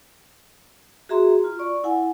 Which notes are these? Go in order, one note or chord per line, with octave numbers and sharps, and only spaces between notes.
F#4 G#4 E5 A#5 C6
F4
D5 C#6
E4 F#5 G#5